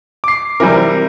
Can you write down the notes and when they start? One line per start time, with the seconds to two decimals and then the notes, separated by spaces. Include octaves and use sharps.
0.24 D6 C7
0.60 C3 E3 G3 A#4